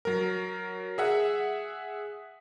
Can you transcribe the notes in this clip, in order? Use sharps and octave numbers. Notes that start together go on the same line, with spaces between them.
F#3 A#4
G#4 E5 F#5